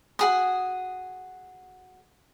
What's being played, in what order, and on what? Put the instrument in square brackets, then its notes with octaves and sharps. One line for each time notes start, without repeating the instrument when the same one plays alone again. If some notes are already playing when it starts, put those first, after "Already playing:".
[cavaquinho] F#4 G#4 D#6